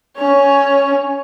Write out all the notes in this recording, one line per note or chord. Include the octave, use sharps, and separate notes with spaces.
C#4 C#5